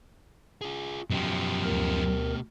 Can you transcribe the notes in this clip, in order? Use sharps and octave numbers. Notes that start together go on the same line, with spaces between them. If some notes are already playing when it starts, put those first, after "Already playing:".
F4 G#4
F#2 B2 F3 G4
D2 A#4